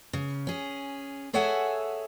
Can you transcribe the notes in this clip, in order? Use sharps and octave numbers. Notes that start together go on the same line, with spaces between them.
C#3
C#4 G#4
G#4 A4 C#5 E5 F#5 G#5